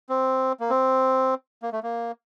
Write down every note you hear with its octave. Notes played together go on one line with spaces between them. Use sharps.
C4
A#3
C4
A#3
A3
A#3